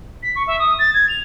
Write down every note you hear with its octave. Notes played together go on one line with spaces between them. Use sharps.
B6
C#6
E5
D#6
A6
G#6
F7